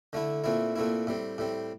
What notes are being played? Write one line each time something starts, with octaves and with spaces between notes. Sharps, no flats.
D3 A3 E4
A#2 A3 C4 E4
A#2 A3 C4 E4
A2 G3 C4
A2 G3 C4